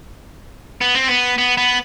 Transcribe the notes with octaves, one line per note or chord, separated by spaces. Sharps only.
B3
C4
B3
B3
B3